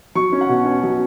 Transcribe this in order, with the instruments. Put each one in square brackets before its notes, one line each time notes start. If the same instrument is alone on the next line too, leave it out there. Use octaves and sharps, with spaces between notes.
[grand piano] F#3 C#6
C#4
F#5
B2
C#4
F#3